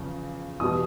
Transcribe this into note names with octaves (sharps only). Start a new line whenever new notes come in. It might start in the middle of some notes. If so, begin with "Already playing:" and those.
Already playing: E2 C#3 F3
E2 B2 G3 D#6